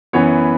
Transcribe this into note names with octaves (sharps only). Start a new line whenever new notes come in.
F#2 E3 B3 C#5